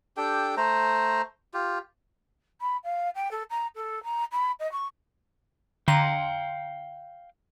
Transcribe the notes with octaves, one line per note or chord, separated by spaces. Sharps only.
D4 G4 A4 G5
A3 C5 A#5
F4 G4
B5
F5
G5
A4
A#5
A4
A#5
B5
D#5
C#6
D3 F5 G5 A#5 C6